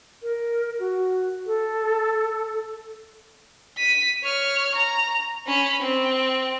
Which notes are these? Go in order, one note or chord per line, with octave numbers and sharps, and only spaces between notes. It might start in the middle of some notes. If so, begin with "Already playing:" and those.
A#4
F#4
A4
B6 D#7
C#5 F6
A#5
C#4 B5
C4